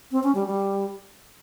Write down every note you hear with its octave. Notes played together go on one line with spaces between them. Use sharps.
C4
C#4
G3
G3